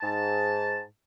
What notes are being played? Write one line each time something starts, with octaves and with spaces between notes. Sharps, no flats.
G#2 A5